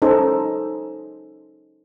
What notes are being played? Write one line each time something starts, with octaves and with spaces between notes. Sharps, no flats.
C#4 D#4 A4 C5